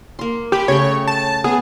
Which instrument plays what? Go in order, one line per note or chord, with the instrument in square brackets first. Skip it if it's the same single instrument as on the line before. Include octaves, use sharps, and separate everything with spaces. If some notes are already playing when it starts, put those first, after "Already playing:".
[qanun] A#3 C6
[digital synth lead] G4 [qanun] G#5 B5
[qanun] C#3 A3 G5 [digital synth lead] C#5
[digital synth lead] A5
[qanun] B3 [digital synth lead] G#4